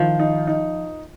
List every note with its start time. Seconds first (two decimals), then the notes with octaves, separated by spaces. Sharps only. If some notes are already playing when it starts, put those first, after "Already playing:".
Already playing: D#3 F3
0.19 D#4
0.47 D#4